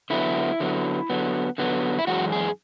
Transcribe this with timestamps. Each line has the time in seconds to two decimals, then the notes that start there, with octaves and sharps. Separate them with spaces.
0.10 D3 F#3 B3 E4
0.60 D3 F#3 B3
1.10 D3 F#3 B3
1.58 D3 F#3 B3
1.99 E4
2.07 F#2 E3 G#3 F#4
2.32 G#4